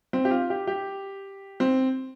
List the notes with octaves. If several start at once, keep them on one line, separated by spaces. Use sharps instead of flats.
C4
G4
F4
G4
G4
C4